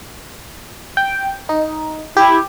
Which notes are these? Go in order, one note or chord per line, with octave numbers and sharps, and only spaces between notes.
G5
D#4
E4 G4